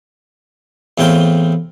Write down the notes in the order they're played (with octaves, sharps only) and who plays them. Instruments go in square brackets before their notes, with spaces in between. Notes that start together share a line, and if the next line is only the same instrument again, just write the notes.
[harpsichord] E2 A2 C4 F4 G5